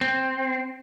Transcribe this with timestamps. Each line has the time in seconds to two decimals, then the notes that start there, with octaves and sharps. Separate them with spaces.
0.01 C4